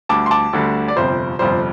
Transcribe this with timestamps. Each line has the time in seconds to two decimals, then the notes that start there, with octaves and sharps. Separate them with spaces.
0.09 D2 D3 G3 A5 D6
0.26 C6
0.31 A5 D6
0.53 D2 D3 G3
0.88 D5
0.96 G1 F2 C3 G3 C5
1.39 G1 F2 C3 G3 C5